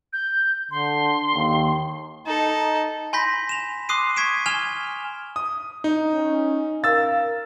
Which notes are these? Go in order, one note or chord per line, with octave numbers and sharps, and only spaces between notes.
G6
D3 C6
D#2
D#4 A4
G#5 B5 C6 G6 A#6 B6
E7 F7
C6 D6 D#6 F#6 C7 D#7
C#6 G#6 B6 D7 E7
G#5 F6 G#6 E7 F7 G7
D#6
D#4
C#4
A#4 F5 E6 A6